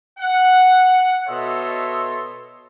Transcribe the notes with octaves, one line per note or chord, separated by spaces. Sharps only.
F#5
B2 A4 C#5 D#5 E5 C6